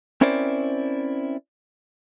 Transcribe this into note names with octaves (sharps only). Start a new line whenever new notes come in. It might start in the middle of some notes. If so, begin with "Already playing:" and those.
C4 C#4 E4 A#4 C5 D5